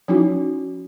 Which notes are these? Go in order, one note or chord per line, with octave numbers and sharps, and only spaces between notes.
F3 C#4 D#4 E4 F#4